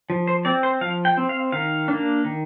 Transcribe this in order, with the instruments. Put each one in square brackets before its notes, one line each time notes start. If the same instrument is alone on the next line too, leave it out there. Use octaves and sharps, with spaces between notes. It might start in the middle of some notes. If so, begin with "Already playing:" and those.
[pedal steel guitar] F3
C5
C4 D5
C5
F3 F5
G5
C4
F5
D#3 F5
A#3 D4
D#3